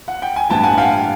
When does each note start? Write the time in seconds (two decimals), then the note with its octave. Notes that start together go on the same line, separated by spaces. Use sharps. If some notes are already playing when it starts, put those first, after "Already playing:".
0.08 F#5
0.22 G5
0.36 G#5
0.49 A1 G2 E3 G5 A5
0.63 F#5 G#5
0.78 F5 G5